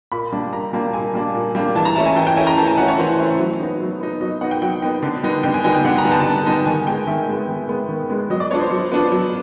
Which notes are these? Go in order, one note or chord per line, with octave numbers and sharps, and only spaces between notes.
A#2 B5
G3 A#3 D4
A#2 A#5
G3 A#3 D4 A5
A#2 G#5
G3 A#3 D4
A#2
G3 A#3 D4
E3 A5
A#5
A3 C#4 E4 A5
G#5
E3 G5
G5
A3 C#4 E4 G#5
A#5
E3 A5
G#5
A3 C#4 E4 F#5
C#5
E3 C5
A3 C#4 E4 C5
F#3
B3 D#4
F#3
B3 D#4
F#3 D#5
B3 D#4 F#5
G5
F#3 G5
B3 D#4 G5
D3
G3 B3 D#4
D3 G5
G#5
G3 B3 D#4 G#5
G5
D3 F#5
A#5
G3 B3 D#4
A5
D3
G3 B3 D#4
D#3 G#5
G#3 B3 G5
D#3 E5
G#3 B3
D#3
G#3 B3
D#3
G#3 B3
F#3 D#5
D5
B3 D4 F4 C#5
C5
F#3
B3 D4 F4
F#3